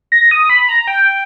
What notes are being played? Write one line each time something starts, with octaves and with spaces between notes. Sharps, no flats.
A#6
D#6
B5
A#5
G5